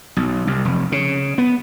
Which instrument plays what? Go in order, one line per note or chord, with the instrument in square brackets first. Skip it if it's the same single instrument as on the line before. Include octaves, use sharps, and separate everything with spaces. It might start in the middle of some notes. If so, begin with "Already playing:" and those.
[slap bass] B1
C2
F1
C#3
B3